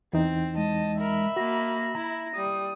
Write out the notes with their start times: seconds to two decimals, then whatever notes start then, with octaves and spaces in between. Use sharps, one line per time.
0.13 E2 E3 C4 D#4
0.57 G#3 D#5 A5
1.00 A#4 E5 B5
1.36 A#3 F#4 A#6
1.95 E4 A#5
2.36 G3 D#6